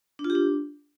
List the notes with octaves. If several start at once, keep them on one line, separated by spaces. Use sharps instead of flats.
D4
F4
G4
D4